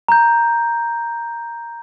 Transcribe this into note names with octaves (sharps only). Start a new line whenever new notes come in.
A#5 G6